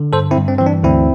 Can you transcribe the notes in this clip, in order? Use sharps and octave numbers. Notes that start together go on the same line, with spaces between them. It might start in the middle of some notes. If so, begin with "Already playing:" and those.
Already playing: D3
G2 A4 C5
C4 E4
G2
C4
E3 C4
D4
D2 C4 E4